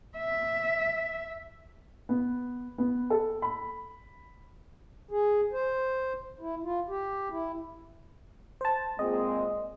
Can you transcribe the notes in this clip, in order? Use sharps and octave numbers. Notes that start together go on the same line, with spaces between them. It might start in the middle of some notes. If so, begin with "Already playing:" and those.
E5
B3
B3
A4
B5
G#4
C5
E4
F4
G4
E4
C5 A5
A#2 G#3 C4 D#5